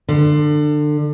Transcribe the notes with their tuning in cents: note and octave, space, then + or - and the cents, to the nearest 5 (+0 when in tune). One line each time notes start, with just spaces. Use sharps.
D3 +25